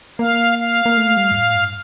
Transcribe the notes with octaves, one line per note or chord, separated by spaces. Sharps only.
A#3 F5
F5
A#3
A3
G3
G2
A2
G2